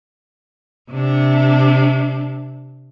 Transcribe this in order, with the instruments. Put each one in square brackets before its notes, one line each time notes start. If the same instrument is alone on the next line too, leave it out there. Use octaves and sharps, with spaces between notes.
[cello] C3 D4